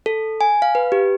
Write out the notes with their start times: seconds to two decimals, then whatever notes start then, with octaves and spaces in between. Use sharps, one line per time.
0.06 A4
0.41 G#5
0.62 F5
0.75 B4
0.92 G4